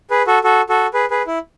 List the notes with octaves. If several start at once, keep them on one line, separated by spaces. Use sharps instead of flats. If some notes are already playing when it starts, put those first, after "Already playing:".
G#4 B4
F#4 A4
F#4 A4
F#4 A4
G#4 B4
G#4 B4
E4